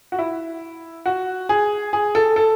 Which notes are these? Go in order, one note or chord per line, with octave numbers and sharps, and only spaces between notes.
F#4
E4
F#4
G#4
G#4
A4
A4